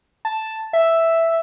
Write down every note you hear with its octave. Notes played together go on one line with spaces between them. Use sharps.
A5
E5